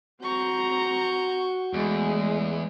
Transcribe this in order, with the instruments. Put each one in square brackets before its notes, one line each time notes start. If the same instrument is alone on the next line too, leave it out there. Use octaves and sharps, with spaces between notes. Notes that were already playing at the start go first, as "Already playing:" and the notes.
[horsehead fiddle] C4 A#5 [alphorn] F#4 [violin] C#6 G6
[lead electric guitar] E2 [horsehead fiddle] G#3 A3